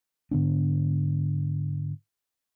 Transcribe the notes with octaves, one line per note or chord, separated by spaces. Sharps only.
G#2 D3 B3 D4